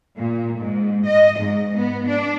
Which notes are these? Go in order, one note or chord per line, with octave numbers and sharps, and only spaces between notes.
A#2
G#2
D#5
G#2
B3
D4